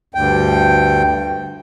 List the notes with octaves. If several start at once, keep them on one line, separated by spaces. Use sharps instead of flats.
D2 G2 G5